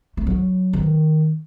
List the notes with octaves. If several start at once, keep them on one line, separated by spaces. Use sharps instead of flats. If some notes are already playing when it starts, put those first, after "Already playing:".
A3
F#3
D#3